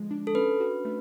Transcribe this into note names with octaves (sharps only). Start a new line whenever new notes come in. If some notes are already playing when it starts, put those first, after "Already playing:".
Already playing: D3 F3 G#3
D4
A4
C#4 B4
F#4
A3